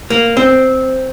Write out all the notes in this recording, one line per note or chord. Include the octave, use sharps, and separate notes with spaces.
A#3
C4